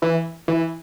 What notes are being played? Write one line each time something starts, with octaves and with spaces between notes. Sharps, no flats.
E3
E3